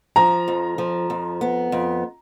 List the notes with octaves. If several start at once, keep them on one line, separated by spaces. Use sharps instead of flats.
F3 A#5
F2
F3
F2
B3
F2